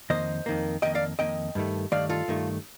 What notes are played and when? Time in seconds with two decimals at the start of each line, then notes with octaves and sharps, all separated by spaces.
0.10 F2 D#3 A#3 C5 D#5
0.46 F2 D#3 A#3
0.82 F2 D#3 A#3 D#5 G5
0.95 D5 F5
1.19 F2 D#3 A#3 D#5 G5
1.55 G2 D#3 A3
1.92 G2 D#3 A3 D5 F5
2.09 F4 A4
2.28 G2 D#3 A3